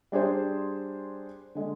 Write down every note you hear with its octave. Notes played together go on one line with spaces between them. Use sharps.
G3 D4 G#4 C5
D3 G#3